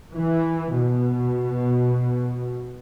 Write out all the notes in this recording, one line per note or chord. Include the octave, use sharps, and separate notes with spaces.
E3
B2